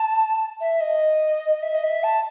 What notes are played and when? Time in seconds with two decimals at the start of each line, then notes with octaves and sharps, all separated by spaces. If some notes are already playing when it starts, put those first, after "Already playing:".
Already playing: A5
0.61 E5
0.81 D#5
1.62 E5
1.74 D#5
1.83 E5
2.04 A5